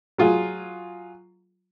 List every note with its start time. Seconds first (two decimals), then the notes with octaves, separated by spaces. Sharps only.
0.18 F#3 F4 G#4